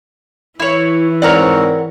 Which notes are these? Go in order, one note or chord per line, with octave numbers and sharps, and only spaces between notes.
E3 E4 C#5
G#2 C4 A#4 C#5 D5 F#5 A#5